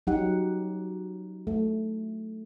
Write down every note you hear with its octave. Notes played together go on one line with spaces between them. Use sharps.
F#3 D#4 G4 F#5
A3